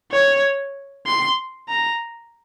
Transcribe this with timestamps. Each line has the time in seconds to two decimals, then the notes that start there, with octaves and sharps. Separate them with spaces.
0.12 C#5
1.06 C6
1.69 A#5